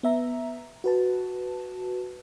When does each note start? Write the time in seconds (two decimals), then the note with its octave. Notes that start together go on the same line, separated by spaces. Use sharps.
0.03 B3 E5 A#5
0.84 F#4 B4 A5